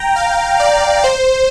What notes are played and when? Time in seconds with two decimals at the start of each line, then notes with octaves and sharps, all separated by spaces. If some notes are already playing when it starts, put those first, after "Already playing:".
Already playing: G5 A#5
0.16 F5
0.60 D5
1.04 C5